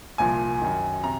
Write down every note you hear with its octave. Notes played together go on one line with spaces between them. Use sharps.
C2 A#2 F3 G#5
F#2 D#3
C3 A#5